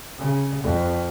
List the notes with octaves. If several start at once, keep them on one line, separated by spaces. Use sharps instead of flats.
C#3
F2